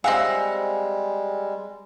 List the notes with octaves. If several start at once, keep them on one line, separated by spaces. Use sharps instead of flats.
G3 G#3 C4 E5 F5 G#5 F#6 A#6